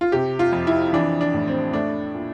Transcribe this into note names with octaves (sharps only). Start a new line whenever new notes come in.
F4
C3 G4
F4
F2
E4
E3 D4
D4
A2
C4
A3 D4
A#2